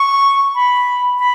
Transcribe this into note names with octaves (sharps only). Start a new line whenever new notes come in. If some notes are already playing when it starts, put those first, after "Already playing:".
Already playing: C#6
B5
B5